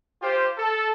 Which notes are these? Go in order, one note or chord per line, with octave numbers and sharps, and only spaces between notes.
F4 G4 C5
A4